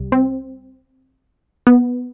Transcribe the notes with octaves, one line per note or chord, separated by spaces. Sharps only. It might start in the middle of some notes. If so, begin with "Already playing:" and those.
Already playing: C2 G3
C4
B3